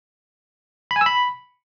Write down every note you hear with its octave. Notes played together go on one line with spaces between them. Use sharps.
B5
G#5
E6
B5